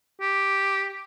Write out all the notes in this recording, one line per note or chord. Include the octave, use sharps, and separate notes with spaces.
G4